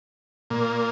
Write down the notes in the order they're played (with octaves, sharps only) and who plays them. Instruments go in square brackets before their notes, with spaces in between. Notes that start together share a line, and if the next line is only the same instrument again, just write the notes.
[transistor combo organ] A#2 A#3